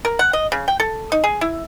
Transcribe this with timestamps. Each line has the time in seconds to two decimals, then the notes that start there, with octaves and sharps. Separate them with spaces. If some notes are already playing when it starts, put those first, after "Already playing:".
0.05 A#4
0.19 F#5
0.33 D#5
0.52 C#3
0.68 G5
0.80 A4
1.12 D#4
1.24 G#4
1.41 E4